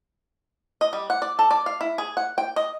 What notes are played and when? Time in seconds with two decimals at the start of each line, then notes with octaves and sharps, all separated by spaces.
0.81 D#5
0.93 G3
1.10 F#5
1.22 D5
1.39 A4
1.51 D5
1.66 F5
1.81 E4
1.98 G#4
2.17 F#5
2.38 G5
2.56 D#5